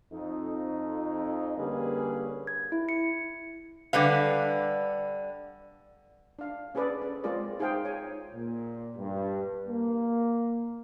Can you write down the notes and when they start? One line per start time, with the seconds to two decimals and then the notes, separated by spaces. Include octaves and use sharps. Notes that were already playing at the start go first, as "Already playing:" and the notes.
0.12 F2 D#4
1.57 D3 G3 A#3 C#4 G#4 B4
2.47 G#6
2.72 E4
2.89 C#7
3.93 D3 G3 B4 F5
6.39 D4 F5
6.75 C#4 G#4 A4 B4 D5
7.02 C#4
7.24 G#3 C4 F4 G#4 A#4 D5
7.59 D#4 G#4 C5 F5 G5
7.85 C#5 G#5
8.33 A#2
8.97 G2
9.67 A#3